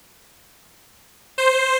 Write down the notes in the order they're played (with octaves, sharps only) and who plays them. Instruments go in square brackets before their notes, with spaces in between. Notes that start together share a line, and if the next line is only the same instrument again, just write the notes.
[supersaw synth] C5